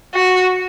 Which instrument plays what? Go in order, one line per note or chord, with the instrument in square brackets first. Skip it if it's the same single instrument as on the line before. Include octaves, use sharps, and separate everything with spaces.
[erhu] F#4